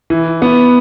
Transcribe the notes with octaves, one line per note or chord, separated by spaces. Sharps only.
E3
B3